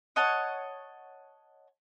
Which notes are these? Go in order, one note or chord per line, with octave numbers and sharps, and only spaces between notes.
C#5 D#5 F#5 A5